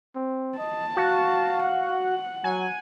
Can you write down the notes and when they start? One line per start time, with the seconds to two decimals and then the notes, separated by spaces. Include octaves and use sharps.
0.16 C4
0.58 D#5 A5
0.97 F#4 F5
1.66 F#5
2.44 F#3 G#5